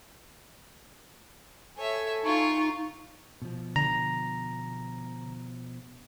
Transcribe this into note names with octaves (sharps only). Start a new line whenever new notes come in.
A4 C#5 E5 G#5
D#4 F4 C#6
B2 F3
D3 A#5